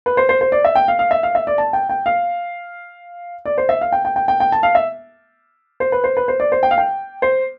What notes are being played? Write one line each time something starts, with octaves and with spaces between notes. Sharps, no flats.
B4
C5
C5
C5
D5
E5
G5
F5
F5
E5
F5
E5
D5
A5
G5
G5
F5
D5
C5
E5
F5
G5
G5
G5
G5
G5
A5
F5
E5
C5
B4
C5
B4
C5
D5
C5
G5
F5
G5
C5